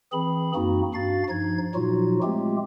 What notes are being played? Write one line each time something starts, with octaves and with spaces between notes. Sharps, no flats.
E3 C4 G#4 B5
F#2 A#3 C4 D#4 F#4
G2 D4 F#4 F5 A6
G2 F3 D#4 G#6
A#2 F3 F#3 D#4 F4 F#4
G#3 A3 C4 F4 G4